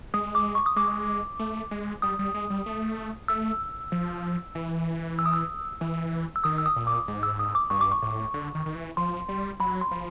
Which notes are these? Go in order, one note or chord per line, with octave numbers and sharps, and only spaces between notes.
G#3 D#6
D6
C#6
D#6
G#3 D6
A3
G#3
G3 D#6
G3
G#3
G3
A3
A3 E6
F3
E3
E6
D#6
E6
E3
E6
D#3 D#6
E6
D#6
A#2
D6
G#2
E6
D#6
D6
G2 C#6
D6
C#6
A2
D3
D#3
D#3
E3
F3 C6
G3
F#3 B5
C6
F3